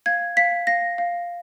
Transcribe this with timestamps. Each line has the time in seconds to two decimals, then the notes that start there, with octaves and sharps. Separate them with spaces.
0.06 F5 G#6
0.37 F5 B6
0.67 F5 A#6
0.98 F5